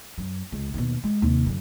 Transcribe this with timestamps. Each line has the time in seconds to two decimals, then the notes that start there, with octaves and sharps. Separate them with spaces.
0.18 F#2
0.52 C#2
0.74 D#2 B2
1.04 G#3
1.22 D#2 C3
1.46 F#2 D3